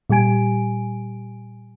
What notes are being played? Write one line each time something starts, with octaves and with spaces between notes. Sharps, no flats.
A#2 G3 G4 G#5 D7